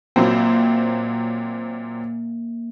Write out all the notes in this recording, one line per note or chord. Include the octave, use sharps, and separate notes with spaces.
A#2 F#3 A#3 C4